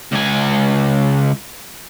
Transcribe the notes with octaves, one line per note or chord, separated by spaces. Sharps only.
C#2 G#5